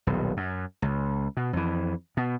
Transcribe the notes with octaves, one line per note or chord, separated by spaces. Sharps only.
D#1 B1
F#2
C#2
B2
F2 E3
B2